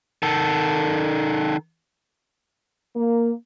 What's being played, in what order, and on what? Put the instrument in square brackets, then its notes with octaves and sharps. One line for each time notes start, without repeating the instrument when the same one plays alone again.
[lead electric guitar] D#3 A4
[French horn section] A#3